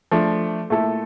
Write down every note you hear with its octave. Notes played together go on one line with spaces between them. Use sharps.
F3 A3 D4
A#2 A3 E4 A4